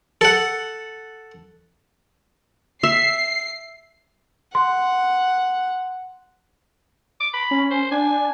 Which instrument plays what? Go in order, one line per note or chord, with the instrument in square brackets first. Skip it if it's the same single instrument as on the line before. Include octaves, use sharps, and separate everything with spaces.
[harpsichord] A4 F#5
[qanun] E5 [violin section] C7
[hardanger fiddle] F#5 [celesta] C6
[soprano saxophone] D6
B5
[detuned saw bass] C#4
[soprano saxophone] C5
[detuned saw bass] D4 [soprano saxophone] G#5